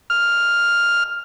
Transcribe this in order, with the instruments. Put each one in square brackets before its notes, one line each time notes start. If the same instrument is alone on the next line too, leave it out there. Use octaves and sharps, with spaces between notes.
[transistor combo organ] F6